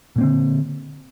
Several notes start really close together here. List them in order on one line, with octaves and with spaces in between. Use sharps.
A#2 A#3 C4 D3